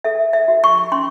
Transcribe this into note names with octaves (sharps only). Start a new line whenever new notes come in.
A4 E5
E5
F#4
C#6
C#4 C6